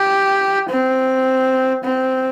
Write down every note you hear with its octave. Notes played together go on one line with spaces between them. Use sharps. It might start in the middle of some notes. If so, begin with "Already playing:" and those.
Already playing: G4
C4
C4